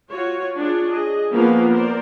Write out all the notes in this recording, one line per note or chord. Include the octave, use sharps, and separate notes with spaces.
F4 F#4 C#5
D4 F4 G#4 C#5
G#4 D#5
F3 A#3 B3 C#4 A#4 F5
A#4 C5 D5